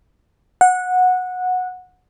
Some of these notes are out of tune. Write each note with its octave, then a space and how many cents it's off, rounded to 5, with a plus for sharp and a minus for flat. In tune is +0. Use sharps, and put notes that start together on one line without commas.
F#5 -15